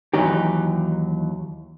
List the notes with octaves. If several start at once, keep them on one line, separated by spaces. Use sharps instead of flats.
D#2 B2 E3 F#3 D#4 G4